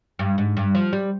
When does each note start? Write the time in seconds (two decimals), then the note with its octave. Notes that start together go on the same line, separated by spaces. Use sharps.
0.19 G2
0.38 G#2
0.57 G2
0.75 F3
0.93 G3